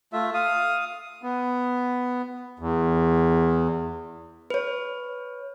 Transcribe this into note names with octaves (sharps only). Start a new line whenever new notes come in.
A3 F4 E5
F5 D#6
B3
E2
B4 C#5